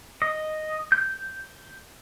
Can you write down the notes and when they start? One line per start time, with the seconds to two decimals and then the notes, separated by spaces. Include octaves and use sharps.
0.22 D#5
0.92 G6